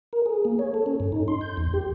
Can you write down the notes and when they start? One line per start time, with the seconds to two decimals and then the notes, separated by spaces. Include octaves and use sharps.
0.13 A#4
0.26 G#4
0.45 A#3
0.59 C#5
0.74 A4
0.86 C#4
1.00 G2
1.12 D#4
1.28 C6
1.41 G6
1.57 E2
1.73 G4